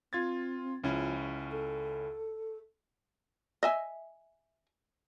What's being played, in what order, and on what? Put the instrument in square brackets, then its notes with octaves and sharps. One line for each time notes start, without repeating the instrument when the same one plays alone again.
[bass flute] C4 [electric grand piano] F4 G#6 A6
[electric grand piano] C#2 C#4 E4 [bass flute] F3
[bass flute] A4
[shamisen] D#5 E5 G#5